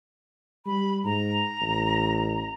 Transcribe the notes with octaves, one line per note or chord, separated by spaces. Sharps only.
G3 B5
G#2 A#5
A1